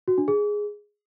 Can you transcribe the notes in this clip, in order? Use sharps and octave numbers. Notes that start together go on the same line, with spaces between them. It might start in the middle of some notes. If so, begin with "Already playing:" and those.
F#4
D4
G#4